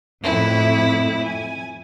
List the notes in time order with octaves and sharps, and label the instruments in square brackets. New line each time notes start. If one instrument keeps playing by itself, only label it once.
[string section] F2 A2 [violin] E4
[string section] G#5